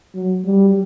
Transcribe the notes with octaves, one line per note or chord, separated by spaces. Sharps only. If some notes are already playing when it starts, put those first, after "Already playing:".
F#3
G3